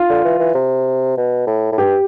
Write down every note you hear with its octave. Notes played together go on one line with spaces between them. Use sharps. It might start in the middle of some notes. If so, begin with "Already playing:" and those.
Already playing: F4
D3
E3
E3
C3
B2
A2
A2
G2 G4